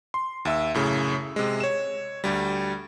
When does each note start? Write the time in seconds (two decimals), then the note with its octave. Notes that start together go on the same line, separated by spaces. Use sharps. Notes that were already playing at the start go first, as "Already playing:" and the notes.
0.14 C6
0.45 D#2 E5 E6
0.74 F#2 A2 C#3
1.36 C3 G#3
1.60 C#5 E7
2.24 D2 G3